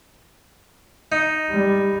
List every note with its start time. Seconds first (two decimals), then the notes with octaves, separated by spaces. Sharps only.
1.12 D#4
1.50 G3